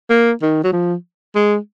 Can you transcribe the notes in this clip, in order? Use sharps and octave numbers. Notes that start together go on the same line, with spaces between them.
A#3
D#3
F#3
F3
G#3